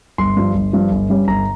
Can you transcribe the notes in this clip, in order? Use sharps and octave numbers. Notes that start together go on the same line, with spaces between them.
G1 C6
G2 F3
G1
G2 F3
G1
G2 G3 C#4
G1 A#5